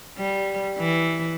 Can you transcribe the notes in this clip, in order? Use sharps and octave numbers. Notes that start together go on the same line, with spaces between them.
G3
E3